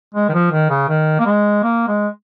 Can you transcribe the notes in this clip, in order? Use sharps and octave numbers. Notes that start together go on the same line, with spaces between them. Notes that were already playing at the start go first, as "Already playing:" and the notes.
G#3
D#3
F3
D#3
C#3
D#3
A#3
G#3
A#3
G#3